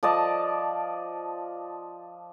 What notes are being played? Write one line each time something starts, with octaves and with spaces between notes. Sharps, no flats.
F3 D5 D#5 A5